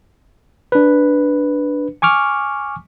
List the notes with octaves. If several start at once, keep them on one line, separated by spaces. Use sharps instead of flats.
D4 B4
G#5 C#6 D6 F6